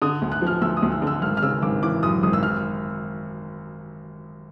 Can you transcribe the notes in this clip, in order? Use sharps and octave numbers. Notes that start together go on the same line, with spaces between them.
D3 D#6
D2
F#6
F3 F6
D2 E6
D#6
D2
E6
D3 E6
G#1 F6
F6
C#3 E6
G#1 D6
E3 D6
F#2 D#6
G#1 D#6
E6
F6